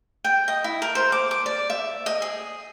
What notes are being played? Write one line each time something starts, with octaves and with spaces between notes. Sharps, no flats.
G5
D#5
E4
A#4
C5
D6
D6
D5
E5
D#5
G#4